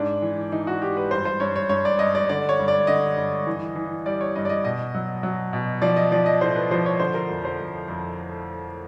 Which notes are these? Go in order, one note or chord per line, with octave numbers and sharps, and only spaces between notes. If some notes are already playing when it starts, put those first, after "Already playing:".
Already playing: G#2 D4
E3
E3 D#4
F#4
E3 G4
B4
G2 C5
C5
G2 C#5
C#5
G2 C#5
D5
G2 D#5
D5
D3 D5
C#5
G2
D5
D3 D#5
G2
E3
E3
G3 D5
C#5
G2 D#5
D5
D#5
B2 D#5
F#3
F#3
B2
F3 D5
D#5
F3 D5
D#5
A2 C5
B4
F3 C5
C#5
D3 C5
A#4
F2
C5
F2
F2